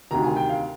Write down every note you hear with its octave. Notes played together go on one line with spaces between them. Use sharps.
D2 C3 D#3 A#5
G#5
G5
F5